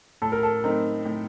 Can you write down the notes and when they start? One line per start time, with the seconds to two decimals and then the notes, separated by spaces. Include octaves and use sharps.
0.22 A2 A4
0.32 A#4
0.43 A4
0.63 A3 C4 D#4 A#4
1.05 A2